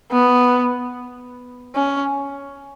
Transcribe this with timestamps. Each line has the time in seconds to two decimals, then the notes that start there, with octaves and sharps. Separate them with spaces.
0.11 B3
1.75 C#4